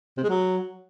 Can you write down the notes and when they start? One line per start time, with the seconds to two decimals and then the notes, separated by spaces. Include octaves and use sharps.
0.17 C3
0.23 G#3
0.29 F#3